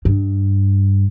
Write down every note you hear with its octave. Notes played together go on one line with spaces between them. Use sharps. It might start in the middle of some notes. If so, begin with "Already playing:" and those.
G2